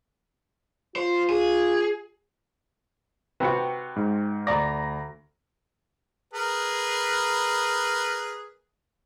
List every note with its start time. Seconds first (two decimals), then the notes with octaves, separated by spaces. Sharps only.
0.96 F4 C5
1.30 G#4
3.40 C3 F#4 B4 G5 C#7
3.96 G#2
4.47 D2 D5 A#5 A#6
6.34 G#4 A#4 B4